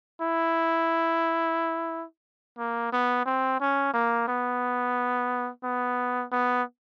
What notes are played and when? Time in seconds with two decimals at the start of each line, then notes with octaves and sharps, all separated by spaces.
0.21 E4
2.58 A#3
2.92 B3
3.26 C4
3.60 C#4
3.94 A#3
4.28 B3
5.63 B3
6.32 B3